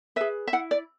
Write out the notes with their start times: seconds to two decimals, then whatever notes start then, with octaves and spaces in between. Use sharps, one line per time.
0.16 G#4 B4 E5
0.47 E5
0.53 E4 F#5
0.71 D5